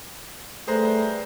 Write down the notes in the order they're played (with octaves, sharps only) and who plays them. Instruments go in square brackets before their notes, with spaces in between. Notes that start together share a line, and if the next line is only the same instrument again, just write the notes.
[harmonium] G3 B4 [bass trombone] A3 [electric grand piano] G#4 C5 A#5